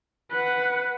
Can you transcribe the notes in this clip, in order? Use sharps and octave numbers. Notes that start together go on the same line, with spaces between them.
B4 F#5